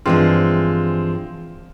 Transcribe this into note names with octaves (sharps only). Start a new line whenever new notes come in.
G2 E3 F3 G#3 C4 F4